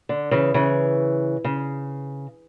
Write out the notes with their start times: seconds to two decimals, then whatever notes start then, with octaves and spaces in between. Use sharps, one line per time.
0.09 D3
0.31 C#3 E3
0.54 C#3 E3
1.44 C#3